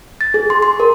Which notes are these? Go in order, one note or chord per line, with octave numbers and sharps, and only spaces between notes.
A6
G#4
C6
C6
A#4